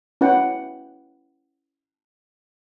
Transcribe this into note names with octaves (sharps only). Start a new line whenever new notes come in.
C#4 E4 B4 F#5 G5